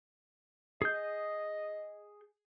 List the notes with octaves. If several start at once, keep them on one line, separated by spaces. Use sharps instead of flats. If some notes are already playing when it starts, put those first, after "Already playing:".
G#4 D#5 G6